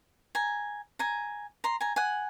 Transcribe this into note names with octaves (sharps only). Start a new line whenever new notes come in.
G#5 A#5
G#5 A#5
A#5 C6
G#5 A#5
F#5 G#5